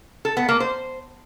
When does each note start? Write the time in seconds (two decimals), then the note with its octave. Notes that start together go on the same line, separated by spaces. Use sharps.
0.25 A4
0.37 B3
0.49 A#3
0.60 C5